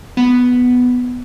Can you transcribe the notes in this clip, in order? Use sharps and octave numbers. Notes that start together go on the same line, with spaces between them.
B3